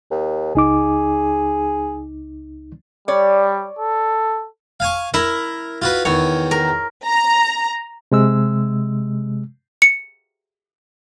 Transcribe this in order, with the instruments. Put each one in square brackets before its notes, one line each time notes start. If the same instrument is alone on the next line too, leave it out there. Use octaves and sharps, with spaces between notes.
[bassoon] D#2
[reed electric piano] C#2 D#4 D6 [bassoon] G#4
[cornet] G3 [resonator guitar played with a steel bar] C#5 D5
[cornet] A4
[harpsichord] F5 G#5 C#6
[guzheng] E4 [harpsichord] A#4
[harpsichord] F4 F#4 B4
[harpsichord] E2 D#3 [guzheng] C#5
[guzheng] A#4
[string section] A#5
[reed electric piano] C3 G#3 E6
[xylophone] C#7